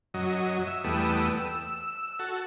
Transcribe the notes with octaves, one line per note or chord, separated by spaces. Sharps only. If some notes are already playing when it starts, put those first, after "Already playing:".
F#2 F#3 D#5
E5
E2 G3 A3 B3 D#6 E6
E6
F#4 A4